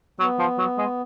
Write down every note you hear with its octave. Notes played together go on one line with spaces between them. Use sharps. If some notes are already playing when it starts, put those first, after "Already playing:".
F#3 B3
F3
F#3
G#3